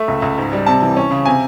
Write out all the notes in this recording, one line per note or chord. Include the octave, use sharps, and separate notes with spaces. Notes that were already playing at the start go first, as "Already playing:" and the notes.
Already playing: A3 E5
C#2
C#2
G#2
G3
C3 A5
E3
C#4
C#3
C3 G#5